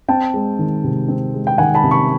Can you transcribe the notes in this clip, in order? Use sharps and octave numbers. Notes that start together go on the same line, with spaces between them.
C4 G5 A5
G#3
D#3
C3
C4
G#3
G5
D#3 F#5 G#5
A5 B5
C3
B5 C#6